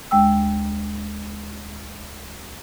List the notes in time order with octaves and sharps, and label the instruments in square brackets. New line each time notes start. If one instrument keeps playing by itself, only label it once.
[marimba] D2 G#3 G5 E6